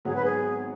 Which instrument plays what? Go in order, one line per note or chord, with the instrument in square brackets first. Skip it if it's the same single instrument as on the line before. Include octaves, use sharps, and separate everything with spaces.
[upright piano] G#1 G#2 F#3 B3 [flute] G#4
[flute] B4
G#4